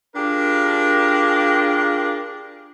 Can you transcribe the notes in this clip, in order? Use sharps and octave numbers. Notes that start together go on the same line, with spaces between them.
D4 F4 G4 G#4 A#4